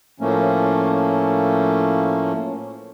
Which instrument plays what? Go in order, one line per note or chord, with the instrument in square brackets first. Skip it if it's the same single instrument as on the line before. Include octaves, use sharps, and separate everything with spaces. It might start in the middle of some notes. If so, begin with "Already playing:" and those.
[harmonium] A2 F3 A3 A#3 C#4